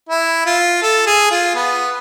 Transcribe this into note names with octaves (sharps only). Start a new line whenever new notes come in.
E4
F4
A4
G#4
F4
B3